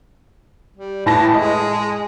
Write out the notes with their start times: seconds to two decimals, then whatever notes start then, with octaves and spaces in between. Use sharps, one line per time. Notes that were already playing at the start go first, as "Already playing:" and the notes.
0.76 G3
1.06 A2 E3 A5 A#6
1.34 G#3 D#5